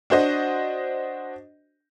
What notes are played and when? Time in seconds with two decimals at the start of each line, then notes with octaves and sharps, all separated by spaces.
0.10 D4 F#4 C5 D#5